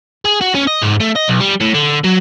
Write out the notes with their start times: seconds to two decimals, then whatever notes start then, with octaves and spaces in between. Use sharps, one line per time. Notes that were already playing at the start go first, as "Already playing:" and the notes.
0.25 G#4
0.41 F#4
0.55 C#4
0.67 D#5
0.82 G#2
1.01 A3
1.16 D#5
1.28 B1
1.41 G3
1.61 A2
1.74 D3
2.04 F#3